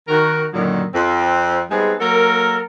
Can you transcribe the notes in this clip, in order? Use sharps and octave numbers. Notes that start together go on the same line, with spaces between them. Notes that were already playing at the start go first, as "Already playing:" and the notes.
D#3 F#4 A#4
F#2 A#2 D3 D#3 F#3
F2 C4
G3 G#3 B3 C4 D#4 G#4
F#3 A#3 A4 A#4